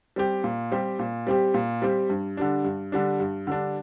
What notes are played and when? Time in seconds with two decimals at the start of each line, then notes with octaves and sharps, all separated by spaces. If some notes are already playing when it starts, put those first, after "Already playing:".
0.16 G3 C4 G4
0.44 A#2
0.72 G3 C4 G4
0.99 A#2
1.27 G3 C4 G4
1.54 A#2
1.82 G3 C4 G4
2.10 G2
2.37 D3 G3 D4
2.64 G2
2.92 D3 G3 D4
3.20 G2
3.47 D3 G3 D4